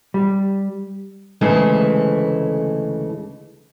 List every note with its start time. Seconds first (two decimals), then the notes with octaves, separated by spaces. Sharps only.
0.14 G3
1.41 D2 C#3 E3 G#3 A3 A4